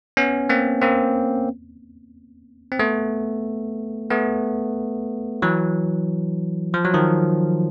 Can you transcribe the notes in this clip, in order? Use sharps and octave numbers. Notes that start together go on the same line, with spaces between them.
B3 C#4
A#3 C4
A#3 C4
C4
A3 B3
A3 B3
E3 F#3
F3
F#3
D#3 F3